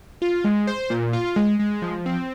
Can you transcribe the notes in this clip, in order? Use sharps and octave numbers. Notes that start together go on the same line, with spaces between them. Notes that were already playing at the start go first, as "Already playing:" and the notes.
F4
G#3
C5
A#2
F4
G#3
G#3
F3
C4